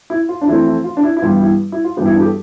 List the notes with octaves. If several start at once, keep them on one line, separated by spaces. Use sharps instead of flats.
E4
F4
D4
F2 E3 A3 C4 E4
E4
F4
D4
E4
E4
G2 E3 G3 B3 F4
E4
E4
F4
G2 E3 G3 B3 G4
E4
D4
G4
A4